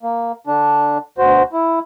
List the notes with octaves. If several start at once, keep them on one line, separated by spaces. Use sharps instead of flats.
A#3
D3 D4
D2 B2 F#4 C5
E4